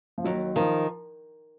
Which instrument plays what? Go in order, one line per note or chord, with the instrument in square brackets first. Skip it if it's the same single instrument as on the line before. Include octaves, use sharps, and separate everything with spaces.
[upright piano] F3
[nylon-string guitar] D#2 [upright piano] F#3
[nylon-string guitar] D#3 [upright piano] F3